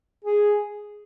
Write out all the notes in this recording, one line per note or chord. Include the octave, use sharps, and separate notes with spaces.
G#4